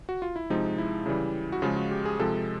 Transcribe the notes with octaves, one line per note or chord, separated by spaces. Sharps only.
F#4
F4
E4
C3 F3 G#3 D#4
E4
C#3 E3 G3
F#4
C#3 F3 G#3 F4
F#4
G4
G#4
C3 F3 G#3 A4